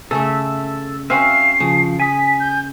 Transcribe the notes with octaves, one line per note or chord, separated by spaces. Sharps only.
C#3 A3 A4 E5
C4 C#4 F#4 E5 F5 C7
C#3 F3
G#5 D#6 B6
G6